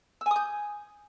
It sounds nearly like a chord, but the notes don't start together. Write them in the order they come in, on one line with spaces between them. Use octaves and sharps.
E6 G#5 D#6 G6